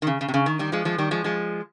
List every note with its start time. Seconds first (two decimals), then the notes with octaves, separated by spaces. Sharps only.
0.02 D#3
0.07 C#3
0.21 C#3
0.28 C3
0.34 C#3
0.46 D#3
0.59 D#3 G3
0.72 F3 G#3
0.85 F3 G#3
0.98 D#3 G3
1.11 F3 G#3
1.24 F3 G#3